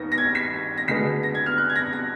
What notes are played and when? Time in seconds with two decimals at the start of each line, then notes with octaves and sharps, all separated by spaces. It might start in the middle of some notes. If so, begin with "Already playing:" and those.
Already playing: D#2 D#3 B3 A#6
0.12 A#6
0.18 G#6
0.35 B6
0.78 A#6
0.88 D2 D3 G#3 B3 B6
1.23 A#6
1.35 G#6
1.46 F6
1.58 F#6
1.70 G#6
1.76 A#6
1.93 A#6